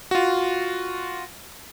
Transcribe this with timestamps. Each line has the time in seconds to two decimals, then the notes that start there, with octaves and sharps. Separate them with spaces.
0.11 F4 F#4